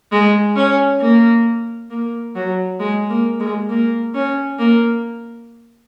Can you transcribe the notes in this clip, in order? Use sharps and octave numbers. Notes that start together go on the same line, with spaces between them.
G#3
C#4
A#3
A#3
F#3
G#3
A#3
G#3
A#3
C#4
A#3